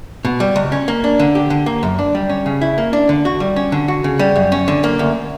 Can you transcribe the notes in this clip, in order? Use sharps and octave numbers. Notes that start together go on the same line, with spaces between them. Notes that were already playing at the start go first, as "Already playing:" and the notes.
B2
G3
C#2
C#4
A#3
D4
D3
G4
D3
A#3
F#2
D4
G3
C#4
C#3
E4
A#3
D4
D3
F#4
G3
C#4
D3
F#4
C#3
G3
F#2
C#4
D3
A#3
D2